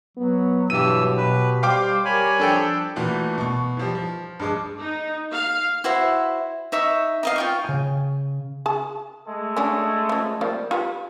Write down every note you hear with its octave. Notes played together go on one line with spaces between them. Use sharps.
F#3 B3
G2 B2 E3 F#3 G4 E6 D#7
B2 B4
G3 C5 F5 G5 D6
G3 A#4 C#5 G#5 B5
F3 D4 A4 G5
A#2 E3 A3 F#4
B2 C#6
E3 F3 G3
F3
G2 G#3 D6
D#4
F5
E4 F#4 C5 E5
D#4 E5 C#6
D#4 D#5 F5
F4 G5 C#6
C#3 G#5
G#4 A5
G#3 A3 A4
C#4 D4 F#4
C#3 F3
F3 G3 A#3
F4 G4 B4